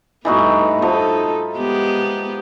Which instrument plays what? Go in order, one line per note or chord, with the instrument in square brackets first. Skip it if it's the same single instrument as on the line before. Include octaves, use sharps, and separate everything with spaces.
[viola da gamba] G2 A3 B3 [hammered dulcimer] E3 D#4 F#4
[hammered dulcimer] F3 [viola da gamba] D#4 A4
[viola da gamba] G#3 B3 G4